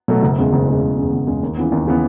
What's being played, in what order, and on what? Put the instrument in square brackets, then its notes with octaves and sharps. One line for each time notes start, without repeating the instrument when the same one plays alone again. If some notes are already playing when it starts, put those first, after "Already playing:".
[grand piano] B2 F#3 A3
F#1
E2 C#3 G#3
F#1
E2 C#3 G#3
F#1
E2 C#3 G#3
F#1
E2 C#3 G#3
D#2
C#3 E3 B3
D#2
C#3 E3 B3